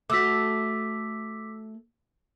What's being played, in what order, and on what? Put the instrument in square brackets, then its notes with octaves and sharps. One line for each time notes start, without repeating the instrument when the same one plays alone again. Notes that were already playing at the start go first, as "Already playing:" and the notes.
[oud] A3 F#4 [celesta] D6 E6 B6